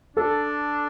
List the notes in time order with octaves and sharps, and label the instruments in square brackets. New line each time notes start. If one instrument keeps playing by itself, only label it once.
[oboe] D4 [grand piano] A4